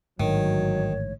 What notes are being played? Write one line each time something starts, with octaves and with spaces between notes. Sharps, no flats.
A1 G#2 D3 D#3 F#3 C#5